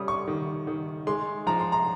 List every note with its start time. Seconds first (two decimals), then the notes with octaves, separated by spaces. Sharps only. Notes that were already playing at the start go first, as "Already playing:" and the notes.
Already playing: G3 C#4 D#6
0.08 C#6
0.28 D#3
0.67 D#3
1.07 G#3 C6
1.47 F3 A#5
1.59 C6
1.72 A#5